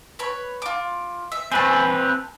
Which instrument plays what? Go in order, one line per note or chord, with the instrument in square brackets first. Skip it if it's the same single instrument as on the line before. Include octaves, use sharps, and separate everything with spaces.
[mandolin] B4 C#5 B5
F4 D6
E5
[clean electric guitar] C4 B4 [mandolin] G#5 A5